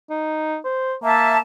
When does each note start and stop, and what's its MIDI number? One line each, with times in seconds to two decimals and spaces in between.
0.10 0.57 63
0.65 0.95 72
1.03 1.38 58
1.03 1.36 76
1.03 1.36 81